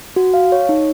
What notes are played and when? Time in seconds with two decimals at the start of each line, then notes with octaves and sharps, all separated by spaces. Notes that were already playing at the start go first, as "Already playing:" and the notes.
0.16 F#4
0.34 F5
0.52 C#5
0.69 D#4